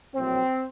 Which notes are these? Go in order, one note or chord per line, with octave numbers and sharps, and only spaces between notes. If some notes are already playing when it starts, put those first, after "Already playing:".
A#1 A2 F#3 C4